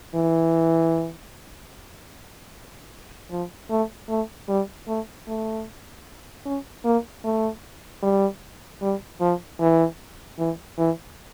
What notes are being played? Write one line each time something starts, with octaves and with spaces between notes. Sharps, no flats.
E3
F3
A3
A3
G3
A3
A3
C#4
A#3
A3
G3
G3
F3
E3
E3
E3